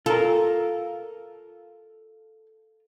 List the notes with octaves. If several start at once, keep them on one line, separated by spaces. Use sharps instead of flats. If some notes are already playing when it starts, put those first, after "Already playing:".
F4 A4 A#4